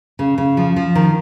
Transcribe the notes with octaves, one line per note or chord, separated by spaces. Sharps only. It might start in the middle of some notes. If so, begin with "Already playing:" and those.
C#3
C#3
F3
F3
D#3